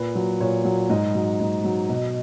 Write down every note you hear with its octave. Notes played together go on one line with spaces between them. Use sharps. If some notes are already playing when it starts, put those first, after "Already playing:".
Already playing: A#2 B4
F#3
A#2 C#5
F#3
G#2 D#5
F#3
G#2
F#3
B2 D#5